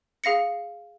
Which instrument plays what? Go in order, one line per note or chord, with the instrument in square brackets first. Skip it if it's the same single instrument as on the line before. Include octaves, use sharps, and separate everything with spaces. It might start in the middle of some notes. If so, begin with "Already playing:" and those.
[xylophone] G#4 F5 A#6 C#7